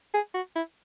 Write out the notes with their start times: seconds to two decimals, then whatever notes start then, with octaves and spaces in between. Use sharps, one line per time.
0.14 G#4
0.34 F#4
0.55 E4